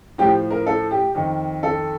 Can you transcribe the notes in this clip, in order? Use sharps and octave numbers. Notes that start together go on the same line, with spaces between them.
A2 F3 G4
A#4
A4
G4
F2 D#3
A4